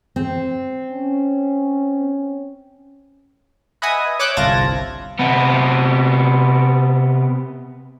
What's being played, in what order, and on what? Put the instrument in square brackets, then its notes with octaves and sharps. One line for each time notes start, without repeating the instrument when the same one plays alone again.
[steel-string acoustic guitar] C4
[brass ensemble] C#4
[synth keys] B4 D#5 E5 F#5 G#5 D#6
C#5 D6 E6 F#6 G6
G1 C2 F4 A5 G#6 A#6
[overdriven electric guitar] C3 B3